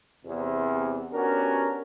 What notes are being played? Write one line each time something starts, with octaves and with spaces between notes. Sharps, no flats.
E2 C3
B3 C#4 D4 F#4 G4 A#4